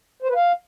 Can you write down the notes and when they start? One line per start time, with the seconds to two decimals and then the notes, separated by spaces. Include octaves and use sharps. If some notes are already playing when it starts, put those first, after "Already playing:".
0.22 C5
0.29 B4
0.35 F5